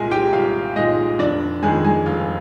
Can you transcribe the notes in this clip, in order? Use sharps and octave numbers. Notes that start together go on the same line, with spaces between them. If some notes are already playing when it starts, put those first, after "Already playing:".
Already playing: C2 A#2 G#3 G#4 A#4 G#5
G4 G5
C2 F4 F5
A#2 G#3 D#4 D#5
F1 D4 D5
F2 D#3 G#3 G#4
G#3 G#4
F1 F4